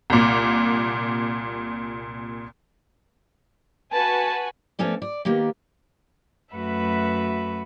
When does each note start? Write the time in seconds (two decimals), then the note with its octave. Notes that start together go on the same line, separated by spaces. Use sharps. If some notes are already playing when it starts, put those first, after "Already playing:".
0.10 C2 A#2
3.92 F#4 B4 G#5 A5
4.79 F3 A3 B3 C#4 A4 D5
5.02 D5
5.25 D#3 A#3 B3 G4
6.55 F#2 A3 F#4 B4 E5 B5